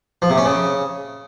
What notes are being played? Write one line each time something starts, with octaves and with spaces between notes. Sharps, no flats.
F3
C3
C#4
C#3